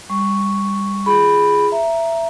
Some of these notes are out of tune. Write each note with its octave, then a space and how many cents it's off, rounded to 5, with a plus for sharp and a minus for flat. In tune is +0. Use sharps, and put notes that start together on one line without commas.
G3 +25 C#6 +0
F4 -20 G#4 +0 B5 +0
E5 +15 A#5 +5